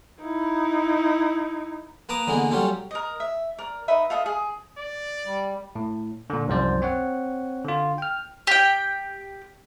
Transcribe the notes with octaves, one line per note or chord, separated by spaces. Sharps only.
D#4 E4
A#3 B4 A5 A#5 D6 D#6
D3 E3 G#3 A#3 B3
F#3 G3 C#4 F4 G4 A4
A#4 D#5
E5
A#4 D5
D#4 B4 D#5 E5
F4 A4 D#5 E5
G#4
D5
G3
A2
A#2 D3
C2 F#2 F3 C5 D5
C4 C#5 F#5
D3 F4
G5 F6
G4 G5